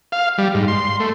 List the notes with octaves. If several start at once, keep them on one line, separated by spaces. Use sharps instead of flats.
F5
G3
G#2
C6
A3